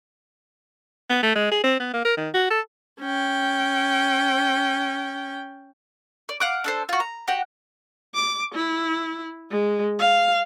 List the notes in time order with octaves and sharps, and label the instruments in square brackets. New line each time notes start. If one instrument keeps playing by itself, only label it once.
[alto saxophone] B3
A3
G#3
G#4
C4
B3
A#3
A#4
D#3
F#4
A4
[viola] C#4 G5
[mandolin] D5
F5 F#5 D6
D4 A4 C5
F4 F#4
A#5
F#4 G4 F#5
[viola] D6
E4
G#3
F5